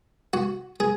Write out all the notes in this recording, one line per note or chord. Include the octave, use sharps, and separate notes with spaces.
F#4
G#4